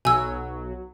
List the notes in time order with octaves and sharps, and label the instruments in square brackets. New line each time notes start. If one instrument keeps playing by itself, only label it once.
[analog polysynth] B1 F#3 [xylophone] G#5 E6